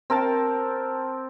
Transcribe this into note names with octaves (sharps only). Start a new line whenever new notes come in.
C4 A#4 G5 A5